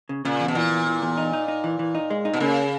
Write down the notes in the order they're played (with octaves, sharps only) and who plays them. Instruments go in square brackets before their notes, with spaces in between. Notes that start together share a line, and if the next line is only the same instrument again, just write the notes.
[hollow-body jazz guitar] C#3
[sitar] A#2 [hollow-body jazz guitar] C#3
[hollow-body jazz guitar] E2
[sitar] B2
[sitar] A#2 [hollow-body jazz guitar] E3
[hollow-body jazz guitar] E2
E3
E2
D#4
D#4
D#4
E3
E3
D#4
G#3
D#4
[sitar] B2
[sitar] C#3 [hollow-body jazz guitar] A#3